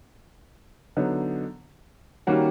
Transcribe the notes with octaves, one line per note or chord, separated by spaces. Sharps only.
D3 F#3 B3 D#4
D#3 G3 A#3 C#4 F#4